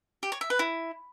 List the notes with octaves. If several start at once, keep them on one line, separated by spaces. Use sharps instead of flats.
G4
C#5
E5
B4
E4